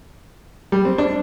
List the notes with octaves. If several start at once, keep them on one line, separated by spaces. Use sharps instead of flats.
G3
C4
D4